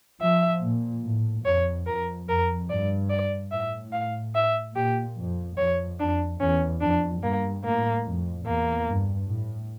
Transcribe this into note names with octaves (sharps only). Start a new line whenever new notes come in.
F3 E5
A#2
A2
F2 C#5
F2 A#4
F2 A#4
G2 D5
D5
A2 E5
F5
E5
A#2 G4
F2
F2 C#5
F2 D4
E2 C#4
F2 D4
G2 A#3
A2 A#3
F2
E2 A#3
G2
A2